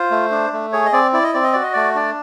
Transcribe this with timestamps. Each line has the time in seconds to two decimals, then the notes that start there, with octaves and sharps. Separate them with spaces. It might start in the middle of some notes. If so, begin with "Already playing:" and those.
Already playing: F4 C5
0.11 A3
0.31 D4
0.53 A3
0.73 G#4 C#5
0.86 D#5
0.93 C4 D5
1.13 E4 D5
1.24 D#5
1.34 C4 D5
1.44 D#5
1.53 F#4 D5
1.63 D#5
1.73 A3 D5
1.95 D4 D5